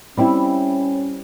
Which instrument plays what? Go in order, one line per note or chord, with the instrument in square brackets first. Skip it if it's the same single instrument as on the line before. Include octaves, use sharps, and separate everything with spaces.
[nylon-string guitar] G3 C4 E4 [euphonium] C#4